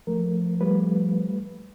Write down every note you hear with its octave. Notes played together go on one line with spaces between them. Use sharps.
F3 A3 A#4
G3 A3 B4